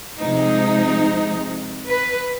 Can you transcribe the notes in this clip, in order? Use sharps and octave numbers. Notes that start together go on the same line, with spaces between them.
C3 F3 G#3 D#4
B4